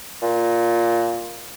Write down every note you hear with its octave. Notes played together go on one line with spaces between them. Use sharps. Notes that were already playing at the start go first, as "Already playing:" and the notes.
A#2